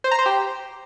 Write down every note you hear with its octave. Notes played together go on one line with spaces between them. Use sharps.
C5
A#5
C5
G4